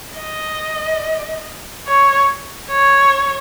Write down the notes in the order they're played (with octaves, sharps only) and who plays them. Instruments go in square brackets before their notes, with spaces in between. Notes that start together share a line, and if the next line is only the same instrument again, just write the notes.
[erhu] D#5
C#5
C#5